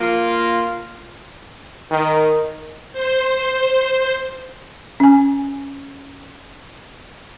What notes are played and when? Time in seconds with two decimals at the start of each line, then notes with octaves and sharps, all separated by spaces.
0.01 A#3 F4
1.91 D#3
2.93 C5
5.00 C#4 G#5